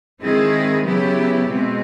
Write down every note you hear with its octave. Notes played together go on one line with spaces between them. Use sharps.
D#3 G#3 C4 E4 G#4
C#3 F#3 B3 E4 G4
B2 G#3 C4